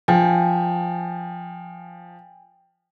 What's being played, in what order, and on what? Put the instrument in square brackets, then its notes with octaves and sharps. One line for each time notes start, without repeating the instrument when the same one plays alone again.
[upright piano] F3 [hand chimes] G5 G#5